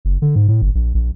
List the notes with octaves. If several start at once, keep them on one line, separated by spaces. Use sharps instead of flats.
F#1
D3
G#2
A2
G1
A#1
A#1